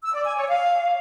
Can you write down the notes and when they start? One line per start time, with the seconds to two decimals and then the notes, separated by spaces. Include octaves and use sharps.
0.02 E6
0.14 D5
0.25 G#5
0.37 C#5
0.48 F5